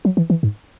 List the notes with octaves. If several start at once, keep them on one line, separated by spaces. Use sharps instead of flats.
F#3
E3
E3
G#2